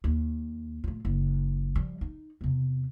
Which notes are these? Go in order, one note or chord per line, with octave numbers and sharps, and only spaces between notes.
D#2
A2 F4
F#1
F3 G3
D#4
E2 C3